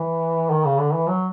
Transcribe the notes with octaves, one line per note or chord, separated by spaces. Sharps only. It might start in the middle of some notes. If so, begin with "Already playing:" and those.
Already playing: E3
D#3
C#3
D3
E3
F#3